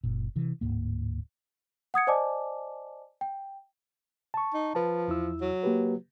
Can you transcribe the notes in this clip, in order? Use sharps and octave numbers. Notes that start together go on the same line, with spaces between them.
F#1 A#2
C3 E3
D1 G#1 G#2 A#3
F#5 D#6 G#6 C#7
C5 D5 D#5 G#5 A5 D6
G5
A5 C#6
D#4
F3 B4 A5
E2 E4 E6
F#3
A#3 G4 B4